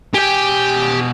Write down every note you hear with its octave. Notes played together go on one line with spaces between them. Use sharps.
B2 G4 G5 G#5